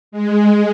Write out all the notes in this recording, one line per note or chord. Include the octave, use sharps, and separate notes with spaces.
G#3